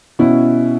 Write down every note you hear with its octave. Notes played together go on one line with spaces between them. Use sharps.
B2 C#4 E4